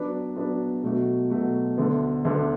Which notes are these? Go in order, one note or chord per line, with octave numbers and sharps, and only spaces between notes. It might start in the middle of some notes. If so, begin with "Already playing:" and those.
Already playing: F#3 B3 D4 B4 D5
F#3 B3 D4 B4 D5
B2 F#3 A3 F#4
B2 F#3 A3 F#4
D2 D3 B3
D2 D3 B3